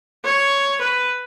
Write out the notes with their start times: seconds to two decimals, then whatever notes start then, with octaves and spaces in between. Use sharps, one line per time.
0.25 C#5
0.81 B4